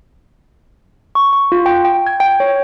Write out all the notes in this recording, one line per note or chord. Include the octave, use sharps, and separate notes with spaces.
C#6
C#6
F4
G5
G5
G#6
G5
C#5